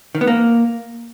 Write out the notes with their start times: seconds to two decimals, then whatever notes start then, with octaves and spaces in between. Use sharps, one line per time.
0.15 D#3
0.21 B3
0.27 A#3